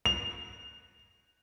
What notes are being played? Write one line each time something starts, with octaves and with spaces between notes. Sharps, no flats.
F7